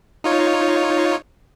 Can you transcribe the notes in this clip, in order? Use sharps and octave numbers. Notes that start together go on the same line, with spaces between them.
D#4 F4 C#5